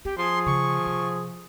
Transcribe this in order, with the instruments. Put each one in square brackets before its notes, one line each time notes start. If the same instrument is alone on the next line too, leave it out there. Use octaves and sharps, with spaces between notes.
[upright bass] C4 [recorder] G4
[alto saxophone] F3 [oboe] G#4 [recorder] C6
[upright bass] C#3 [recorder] C#6
[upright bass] C3